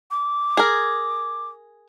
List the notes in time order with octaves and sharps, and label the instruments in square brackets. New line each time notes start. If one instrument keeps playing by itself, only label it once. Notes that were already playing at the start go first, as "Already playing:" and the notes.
[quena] D6
[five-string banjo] G#4 A#4